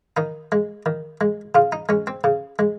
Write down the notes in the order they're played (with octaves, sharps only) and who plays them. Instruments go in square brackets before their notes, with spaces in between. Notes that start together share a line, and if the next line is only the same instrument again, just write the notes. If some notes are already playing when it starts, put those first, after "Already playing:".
[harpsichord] D#3 D#4
G#3
D#3
G#3
C#3 F4
D#4
G#3 C#4
C4
C#3
G#3